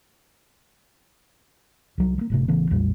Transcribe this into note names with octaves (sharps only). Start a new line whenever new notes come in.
C2 F#3
F#3 A#3
F#1 A2 C3
A1 C#3 E3 B3
B1 F2 A#2 G3